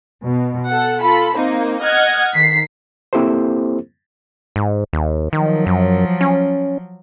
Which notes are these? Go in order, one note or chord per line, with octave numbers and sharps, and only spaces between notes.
B2
A4 F#5
F4 A4 B5
A#3 C4 D#4
D#5 F#5 F6 G#6
D#3 B6 C7
A#3 C4 E4 G4 A4 C5
G#2
D#2
D#3 F3 F#3
F#2
C#4